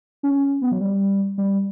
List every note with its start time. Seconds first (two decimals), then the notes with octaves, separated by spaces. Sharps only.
0.23 C#4
0.62 B3
0.72 F#3
0.81 G3
1.38 G3